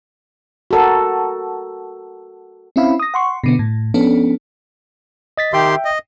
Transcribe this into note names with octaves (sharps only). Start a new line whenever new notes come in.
F#4 A4 A#4
C4 C#4 E4 E5 F5 B5
D#6 A#6
F#5 C6 C#6
B2 D3 B3
A2
F3 B3 C#4 D4 A4
D#5 A6 B6
D#3 G4 E5 G5 C6
D#5